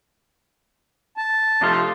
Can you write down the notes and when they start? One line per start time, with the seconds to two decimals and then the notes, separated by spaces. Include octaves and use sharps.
1.17 A5
1.61 C3 F3 A3 D4 D#4 F4